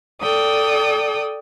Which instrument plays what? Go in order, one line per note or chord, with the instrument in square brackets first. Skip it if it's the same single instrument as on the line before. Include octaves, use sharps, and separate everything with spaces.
[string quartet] A4 D5 G5 D#6